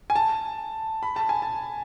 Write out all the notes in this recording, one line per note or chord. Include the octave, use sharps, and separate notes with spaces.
G#5
A5
B5
A5
G#5
A5